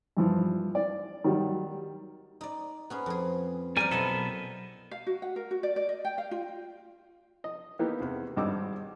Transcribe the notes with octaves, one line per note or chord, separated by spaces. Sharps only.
G2 E3 F3
D5
D#3 F#3 G3
D#4 D5
B3 C#4 G#4
F2 G#4
E2 G3 A#4 C5 D5 G#5
B1 B3 E4 A4 A#4 D#5
F5
F#4
F#5
A#4
F#4
D5
D5
D#5
G5
F5
F4
D#5
E3 A#3 B3 D#4 G4
E2 C3
G#1 G2 G3 D#5 D6 E6